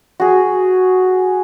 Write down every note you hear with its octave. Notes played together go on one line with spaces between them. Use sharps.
F#4 G#4